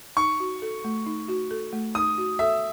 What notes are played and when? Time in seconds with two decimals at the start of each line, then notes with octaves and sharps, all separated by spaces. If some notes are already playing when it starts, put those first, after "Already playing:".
0.17 D#4 C#6
0.40 F#4
0.62 A4
0.85 A3
1.06 D#4
1.28 F#4
1.51 A4
1.73 A3
1.95 D#4 D#6
2.18 F#4
2.39 A4 E5